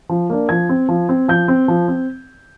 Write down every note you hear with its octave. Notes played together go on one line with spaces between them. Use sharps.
F3
A#3 D4
F3 G#6
C4
F3
C4
F3 G6
C4
F3
C4